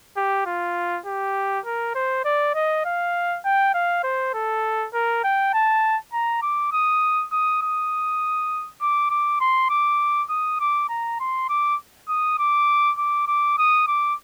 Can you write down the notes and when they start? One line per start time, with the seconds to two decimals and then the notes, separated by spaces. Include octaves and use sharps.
0.17 G4
0.46 F4
1.06 G4
1.66 A#4
1.95 C5
2.25 D5
2.55 D#5
2.85 F5
3.45 G5
3.74 F5
4.04 C5
4.34 A4
4.94 A#4
5.24 G5
5.54 A5
6.13 A#5
6.42 D6
6.72 D#6
7.32 D#6
7.62 D#6
8.81 D6
9.10 D6
9.41 C6
9.70 D6
10.30 D#6
10.60 D6
10.89 A#5
11.20 C6
11.49 D6
12.09 D#6
12.39 D6
12.98 D6
13.28 D6
13.58 D#6
13.88 D6